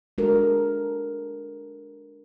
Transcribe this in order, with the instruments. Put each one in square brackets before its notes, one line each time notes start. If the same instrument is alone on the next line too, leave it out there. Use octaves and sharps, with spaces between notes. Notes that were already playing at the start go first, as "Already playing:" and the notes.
[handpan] G#3 D4 F#4 A4 A#4